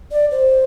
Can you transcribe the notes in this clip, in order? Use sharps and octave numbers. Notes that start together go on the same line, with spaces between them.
D5
C5